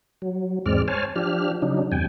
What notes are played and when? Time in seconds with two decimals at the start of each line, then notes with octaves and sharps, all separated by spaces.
0.22 F#3
0.66 E2 G#2 G#3 C4 D5 F6
0.88 C5 C#5 G#5 A5 F6
1.16 F3 D4 G4 F6
1.62 C#3 F#3 D4 D#4
1.92 E2 G2 C3 G5 G#5